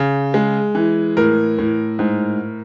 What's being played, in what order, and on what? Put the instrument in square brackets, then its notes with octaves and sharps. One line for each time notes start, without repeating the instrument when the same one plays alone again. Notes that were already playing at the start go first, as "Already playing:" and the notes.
Already playing: [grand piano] C#3
G#3
E3
A2 A#4
A2
G#2